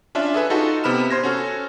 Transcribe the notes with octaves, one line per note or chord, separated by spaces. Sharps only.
C#4 D4 F4 E5
G#4 A4 B4 G#5
D#4 F4 F#4 A4
C3 B3 B5 F6 E7
C5 C6 G#6 A#6
C#4 F#4 A4